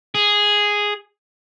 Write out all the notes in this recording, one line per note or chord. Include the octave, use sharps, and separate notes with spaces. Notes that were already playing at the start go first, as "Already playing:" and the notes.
G#4